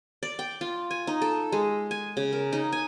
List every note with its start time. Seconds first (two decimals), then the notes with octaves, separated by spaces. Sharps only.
0.23 D5
0.39 G5
0.61 F4
0.91 G#5
1.07 D#4
1.22 A4
1.52 G#3
1.91 G#5
2.17 C#3
2.33 A#4
2.53 D#4
2.72 G#5